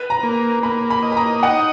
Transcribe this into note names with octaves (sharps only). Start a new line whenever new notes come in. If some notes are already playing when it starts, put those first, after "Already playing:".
Already playing: B4
A#5
A#3
A#3 B5
B5
D#5
B5
A#5
D#4 F#5